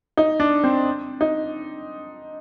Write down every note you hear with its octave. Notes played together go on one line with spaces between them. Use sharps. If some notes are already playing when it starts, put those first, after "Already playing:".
D#4
D4
C4
D#4